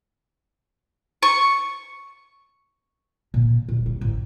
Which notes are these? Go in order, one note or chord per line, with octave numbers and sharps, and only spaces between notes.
C#6
A#2
D#1
G3
A1